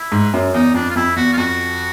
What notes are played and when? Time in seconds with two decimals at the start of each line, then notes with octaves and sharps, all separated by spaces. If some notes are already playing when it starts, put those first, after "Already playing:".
Already playing: E4
0.12 G#2
0.33 F#2
0.54 E2 D#4
0.74 F2 D4
0.89 F4
0.96 F2 E4
1.16 E2 F#4
1.33 F4
1.37 F2 F#4